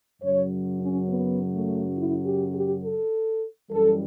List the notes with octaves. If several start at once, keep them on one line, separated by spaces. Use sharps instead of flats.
F#2 C#3 F#3 C#5
C#4
B3
A3
E4
G4
G4
A4
F#2 E3 G3 A4